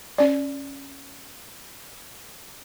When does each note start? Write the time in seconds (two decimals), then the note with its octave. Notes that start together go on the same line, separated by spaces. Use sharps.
0.18 C#4 D5